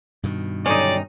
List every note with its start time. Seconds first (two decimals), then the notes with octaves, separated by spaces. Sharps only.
0.23 G2 B2 D#3
0.66 D3 F#3 C#4 D#4 G4 D5